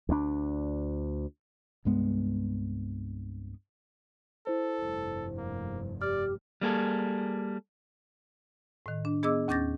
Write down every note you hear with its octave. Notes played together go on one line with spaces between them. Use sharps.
D2 D4
C2 G2 G#3 B3
E4 A4 C5
F1 G2
A#3
G4 D5 F6
G3 A#3 G#4 A4
A2 D#3
D4
B3 G#4 D#5 D6 E6
D#2 C#4 D6 G6 A6 A#6